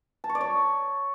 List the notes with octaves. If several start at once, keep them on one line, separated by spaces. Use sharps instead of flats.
A5
C#6
D5
C#5